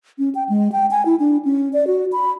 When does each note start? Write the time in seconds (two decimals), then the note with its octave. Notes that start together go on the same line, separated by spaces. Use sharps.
0.19 C#4
0.35 G5
0.49 G#3
0.72 G5
0.91 G#5
1.06 E4
1.20 D4
1.45 C#4
1.73 D5
1.87 F#4
2.12 B5